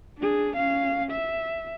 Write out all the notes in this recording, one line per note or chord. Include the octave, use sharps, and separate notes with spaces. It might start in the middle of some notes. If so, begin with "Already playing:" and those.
D4 G#4
C#4 F5
E5